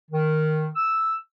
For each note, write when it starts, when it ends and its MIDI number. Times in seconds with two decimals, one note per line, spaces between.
0.11 0.69 51
0.76 1.14 88